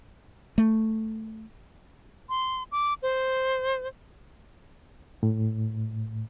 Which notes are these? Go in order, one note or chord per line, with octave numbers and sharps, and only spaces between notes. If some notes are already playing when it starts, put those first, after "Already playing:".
A3
C6
D6
C5
A2